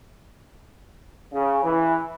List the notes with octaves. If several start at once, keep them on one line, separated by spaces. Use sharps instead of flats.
C#3
E3